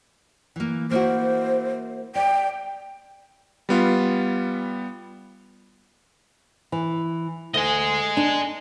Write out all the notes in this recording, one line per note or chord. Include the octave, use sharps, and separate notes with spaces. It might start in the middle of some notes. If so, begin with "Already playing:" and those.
E3 A#3
A#3 E4 F#4 C5
D5 G5
G3 B3 F4
E3
D2 D#5 G#5
D4